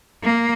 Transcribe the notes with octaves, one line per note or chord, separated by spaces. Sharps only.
A#3